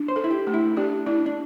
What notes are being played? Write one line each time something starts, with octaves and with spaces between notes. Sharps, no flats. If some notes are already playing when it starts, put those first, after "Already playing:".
Already playing: D4
C5
A4
E4
G4
A3
E4
D4 G4
D4 E4
D4